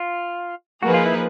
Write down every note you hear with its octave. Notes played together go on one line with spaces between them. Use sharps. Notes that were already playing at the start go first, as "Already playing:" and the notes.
Already playing: F4
F3 A#3 D#4 F#4 G#4 B4
F4
E4